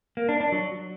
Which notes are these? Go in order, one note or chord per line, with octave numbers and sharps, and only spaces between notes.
A#3
D4
D4
F#3